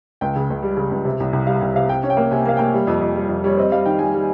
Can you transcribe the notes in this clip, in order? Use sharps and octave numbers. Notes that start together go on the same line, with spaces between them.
C#2 G5
C#3
C#2
G3
C#3
C#2
C3
C2
C2
G3 F5
C2 F5
C3 F5
C3 G5
C#4
G5
A#3
C3 G#5
G5
A#3 F5
A#3 G5
G3
F2
F2
G3
F2
G3 C#5
C4 D#5
G3 F5
D#3 G5
G3 G#5
G3